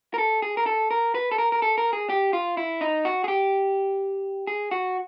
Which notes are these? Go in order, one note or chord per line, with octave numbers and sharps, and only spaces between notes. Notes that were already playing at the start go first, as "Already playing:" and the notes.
A#4
A4
G#4
A#4
A4
A#4
B4
A4
A#4
A#4
A4
A#4
G#4
G4
F4
E4
D#4
F#4
G#4
G4
G#4
F#4